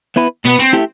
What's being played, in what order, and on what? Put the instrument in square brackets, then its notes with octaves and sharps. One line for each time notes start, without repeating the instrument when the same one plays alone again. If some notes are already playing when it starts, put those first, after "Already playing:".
[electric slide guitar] B3 E4 B4
[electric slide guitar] B2 [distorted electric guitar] B3
[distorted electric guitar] C4
[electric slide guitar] A3 E4 G4